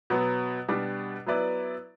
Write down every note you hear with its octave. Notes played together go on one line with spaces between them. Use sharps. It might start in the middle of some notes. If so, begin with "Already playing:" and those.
B2 F#3 B3
B2 G3 D4
F#3 B3 E4 B4 D5